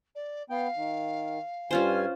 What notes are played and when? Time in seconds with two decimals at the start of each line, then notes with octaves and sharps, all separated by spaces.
0.15 D5
0.50 B3 F5 G5
0.76 D#3
1.71 G2 C#4 F4 C5 G#5